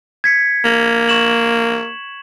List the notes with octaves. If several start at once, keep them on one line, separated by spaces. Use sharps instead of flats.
G#6 B6 C#7
A#3
C#6 E7 F#7